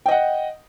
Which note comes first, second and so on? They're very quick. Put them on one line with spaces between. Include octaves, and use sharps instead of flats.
G5 D#5 F#5